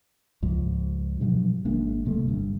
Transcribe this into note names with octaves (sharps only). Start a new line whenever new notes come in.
C#2 G#2 F3
G2 B2 F3 F#3
G#1 G#3 A#3 D4
D1 C3 G3 A3
G1 G2